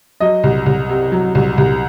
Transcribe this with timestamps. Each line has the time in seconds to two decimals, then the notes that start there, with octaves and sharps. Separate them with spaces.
0.20 F#3 D#5
0.43 C2
0.66 C2
0.89 C3
1.12 F#3
1.35 C2
1.58 C2